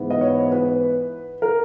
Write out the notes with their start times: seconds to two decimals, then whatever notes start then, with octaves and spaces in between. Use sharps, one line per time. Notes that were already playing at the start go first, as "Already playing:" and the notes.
Already playing: G#2 E3 B3
0.10 D#5
0.21 C#5
0.52 B4
1.42 A#4